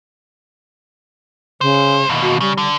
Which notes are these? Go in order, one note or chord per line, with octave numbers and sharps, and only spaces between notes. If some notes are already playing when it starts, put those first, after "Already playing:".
C2 C#3 C5
D#2 B2
F#4
C#3 G3
D3